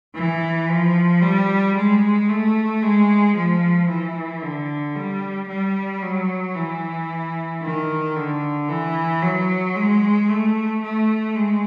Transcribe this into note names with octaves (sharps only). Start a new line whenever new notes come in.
E3
F3
G3
G#3
A3
G#3
F3
E3
D3
G3
G3
F#3
E3
D#3
D3
E3
F#3
G#3
A3
A3
G#3